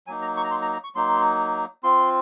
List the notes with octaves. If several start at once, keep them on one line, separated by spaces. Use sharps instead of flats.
F#3 A#3 D#4 G#5
A#5
C#6
A#5
C6
A#5
A#5
C#6
F#3 A#3 D#4 C6
C4 F4 C6